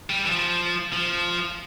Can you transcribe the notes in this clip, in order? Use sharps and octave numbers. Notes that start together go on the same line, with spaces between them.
G3
E3
F3
F3